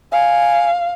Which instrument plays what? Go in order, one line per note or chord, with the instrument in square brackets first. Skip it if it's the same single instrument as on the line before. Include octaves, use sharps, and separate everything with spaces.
[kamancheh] F5 [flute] G#5